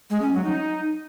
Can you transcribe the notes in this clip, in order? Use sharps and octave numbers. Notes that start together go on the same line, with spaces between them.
G#3
C#4
F#3
D#4